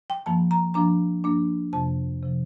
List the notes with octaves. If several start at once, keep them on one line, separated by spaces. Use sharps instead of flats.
G5
G2 F3 A#3 A5
A#5
G2 F3 A#3 D4 A#5
G2 F3 A#3 D4
F2 C3 F3 A5
C3 F3